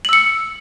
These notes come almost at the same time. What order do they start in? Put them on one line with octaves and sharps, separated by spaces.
F#7 E6 C#7